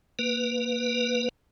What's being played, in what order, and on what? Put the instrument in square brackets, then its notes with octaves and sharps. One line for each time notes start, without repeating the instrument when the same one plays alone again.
[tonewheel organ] A#3 B4